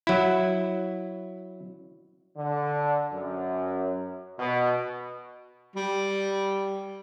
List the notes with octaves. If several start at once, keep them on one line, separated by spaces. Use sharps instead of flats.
F#3 E4
D3
F#2
B2
G3